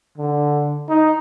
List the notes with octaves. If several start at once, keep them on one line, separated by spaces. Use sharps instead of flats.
D3
D#4